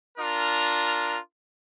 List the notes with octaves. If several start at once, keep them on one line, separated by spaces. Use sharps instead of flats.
D4 F4 A#4